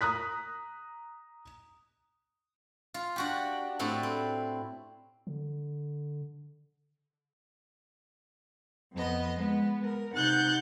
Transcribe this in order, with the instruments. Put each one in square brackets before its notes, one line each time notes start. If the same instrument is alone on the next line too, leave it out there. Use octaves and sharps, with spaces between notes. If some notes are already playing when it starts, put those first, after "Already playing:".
[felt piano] A#5 D#6 F#6 B6
[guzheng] F4
D4 F#4 G4
A2 C4 D4 E4 A4
C4
[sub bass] D3
[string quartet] F2 B3 D#5
G#3 B3
A#4
C3 D#4 F#5 F#6 G6 A6